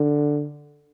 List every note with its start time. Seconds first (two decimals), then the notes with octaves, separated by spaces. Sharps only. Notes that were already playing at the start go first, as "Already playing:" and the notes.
Already playing: D3